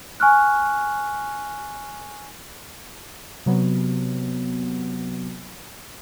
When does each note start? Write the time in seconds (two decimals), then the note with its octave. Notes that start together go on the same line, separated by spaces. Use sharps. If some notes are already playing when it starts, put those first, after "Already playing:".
0.20 G#5 C#6 F6 F#6
3.46 C3 F#3 B3